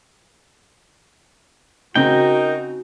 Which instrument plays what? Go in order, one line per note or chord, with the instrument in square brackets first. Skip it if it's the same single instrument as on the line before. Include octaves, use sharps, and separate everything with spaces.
[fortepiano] C#3 C4 [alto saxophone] D#4 [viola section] F#4 [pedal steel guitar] A#4 G5